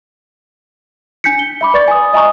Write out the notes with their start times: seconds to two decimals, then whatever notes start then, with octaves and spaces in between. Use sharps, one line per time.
1.24 D4 G#5 G6 B6 C#7
1.39 G7
1.61 E5 B5 D6
1.74 B4 D5 C#6 A6
1.88 G#5 D#6
2.13 D#5 E5 G#5 A#5 C#6 D#6